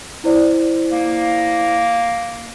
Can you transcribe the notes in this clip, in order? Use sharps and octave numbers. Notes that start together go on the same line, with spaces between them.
E4 C5 D5
A#3